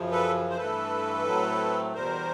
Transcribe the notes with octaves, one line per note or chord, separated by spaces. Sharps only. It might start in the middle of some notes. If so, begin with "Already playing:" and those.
Already playing: F#2 C#3 F3
A4 B4
C5
G2 E3 A3 A4 B4
A2 F#3 A3 C4
E2 B2 G3 A#4 C5